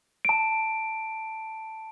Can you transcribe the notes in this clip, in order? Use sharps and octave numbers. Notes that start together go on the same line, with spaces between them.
A5 D7